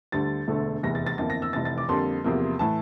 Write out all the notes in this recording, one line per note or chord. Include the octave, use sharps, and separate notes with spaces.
D2 D3 G3 A6
E1 D2 D3 A3
F1 E2 E3 A#6
A6
A6
G1 F2 E3 A#3 A6
A#6
E6
F1 F2 E3 A6
A6
D6
F2 D3 G3 A#3 C6
E2 C3 F3 A#3
A2 E3 A5